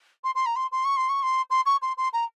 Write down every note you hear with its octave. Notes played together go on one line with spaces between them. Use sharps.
C6
C6
A#5
C6
C6
C#6
C6
C#6
C6
C6
C#6
C6
C6
A#5